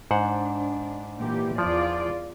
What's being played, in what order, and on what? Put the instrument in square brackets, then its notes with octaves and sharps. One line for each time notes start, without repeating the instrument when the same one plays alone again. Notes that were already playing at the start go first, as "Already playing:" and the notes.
[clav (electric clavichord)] G#2 C5 F#5 [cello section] D4
[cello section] A#2 E3 G4
[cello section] E2 F4 D5 [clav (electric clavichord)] F3